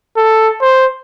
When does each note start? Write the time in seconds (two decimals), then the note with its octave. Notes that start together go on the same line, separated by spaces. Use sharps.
0.17 A4
0.61 C5